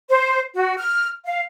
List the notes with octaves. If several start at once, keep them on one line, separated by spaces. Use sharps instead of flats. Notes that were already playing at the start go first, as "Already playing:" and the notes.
C5
F#4
F6
F5